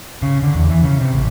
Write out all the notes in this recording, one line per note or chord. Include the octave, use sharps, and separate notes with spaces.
C#3
D3
E2
E3
C#3
C3
A1